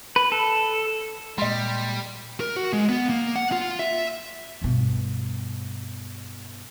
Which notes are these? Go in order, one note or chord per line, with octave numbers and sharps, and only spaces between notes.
B4
A4
A#2 G3 G#3 D#5 C6
A#4
F#4
G#3
B3
A#3
F#5
F4
E5
G2 B2